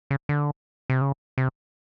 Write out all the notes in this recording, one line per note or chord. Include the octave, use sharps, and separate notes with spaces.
C#3
D3
C3
C#3
C3